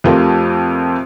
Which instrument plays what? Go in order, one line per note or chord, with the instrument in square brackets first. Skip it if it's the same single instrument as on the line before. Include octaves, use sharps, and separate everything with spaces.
[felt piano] F2 A3 F4 G4 A#4